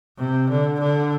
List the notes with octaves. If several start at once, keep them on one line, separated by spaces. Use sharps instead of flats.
C3
D3
D3